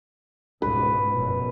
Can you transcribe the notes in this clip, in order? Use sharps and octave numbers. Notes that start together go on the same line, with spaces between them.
C#2 G#2 B2 B4
F1 F#2 B2